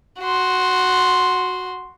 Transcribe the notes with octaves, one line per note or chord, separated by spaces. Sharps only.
F#4 C6